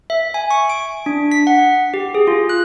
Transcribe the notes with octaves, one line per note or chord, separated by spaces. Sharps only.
E5
G#5
C#6
D7
D4
B6
F#5
G4
G#4
F4
F#6